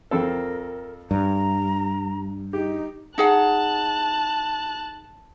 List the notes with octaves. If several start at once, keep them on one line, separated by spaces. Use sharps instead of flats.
F2 C4 A4 A#4
G2 A#5
D#4 G4
D#4 G#4 F#5 A5 F#6